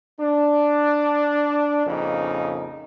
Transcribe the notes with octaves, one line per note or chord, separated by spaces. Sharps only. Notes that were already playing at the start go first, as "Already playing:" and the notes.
D4
A#1 F2 C#3 D#4